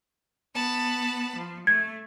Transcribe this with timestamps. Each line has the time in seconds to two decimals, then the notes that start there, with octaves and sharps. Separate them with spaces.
0.54 B3 A5 B5
1.36 F3
1.67 A3 G#6